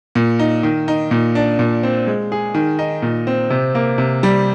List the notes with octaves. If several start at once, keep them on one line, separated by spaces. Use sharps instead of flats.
A#2
D#4
D#3
D#4
A#2
D4
A#2
C4
G#3
G#4
D#3
D#4
A#2
C4
C3
A#3
C3
G3